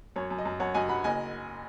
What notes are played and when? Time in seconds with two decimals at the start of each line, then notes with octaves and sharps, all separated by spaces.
0.16 F#2 C#5
0.30 F#2
0.38 D#5
0.45 F#2
0.60 F#2 C#5 F#5
0.74 F#2 D#5 G#5
0.89 F#3 F#5 B5
1.04 F#1 D#5 G#5